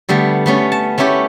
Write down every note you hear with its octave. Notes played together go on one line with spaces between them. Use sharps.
D3 G3 A3 B3
A3 B3 C#4
A5
A3 C#4 E4 G4 C#5